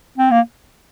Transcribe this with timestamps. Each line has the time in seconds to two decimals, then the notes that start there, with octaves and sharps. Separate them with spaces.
0.18 C4
0.31 A#3